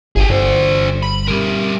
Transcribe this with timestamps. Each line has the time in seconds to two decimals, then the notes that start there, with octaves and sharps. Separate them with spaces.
0.16 G1 G4 G#4
0.30 G1 D4 C5
1.03 B5
1.28 G3 A#4